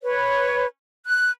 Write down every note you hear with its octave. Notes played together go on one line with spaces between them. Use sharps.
B4 C#5
F#6